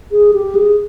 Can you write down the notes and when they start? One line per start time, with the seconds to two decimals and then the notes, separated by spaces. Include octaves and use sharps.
0.12 G#4
0.33 G4
0.55 G#4